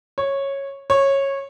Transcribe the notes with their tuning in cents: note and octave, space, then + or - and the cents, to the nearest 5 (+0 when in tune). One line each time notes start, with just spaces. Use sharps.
C#5 -10
C#5 -15